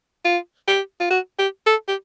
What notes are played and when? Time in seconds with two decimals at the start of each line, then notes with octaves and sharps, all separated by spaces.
0.25 F4
0.68 G4
1.00 F4
1.10 F#4
1.39 G4
1.66 A4
1.88 G4